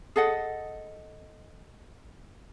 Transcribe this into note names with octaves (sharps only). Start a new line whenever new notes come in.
G#4 A4 D#5 F#5